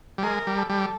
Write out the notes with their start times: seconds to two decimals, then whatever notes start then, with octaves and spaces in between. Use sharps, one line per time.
0.18 G3
0.23 G#3 A#4
0.47 G3
0.58 A4
0.70 G3